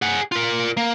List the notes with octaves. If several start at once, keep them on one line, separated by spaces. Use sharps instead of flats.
G#4 F#5
F4 A#4
A#3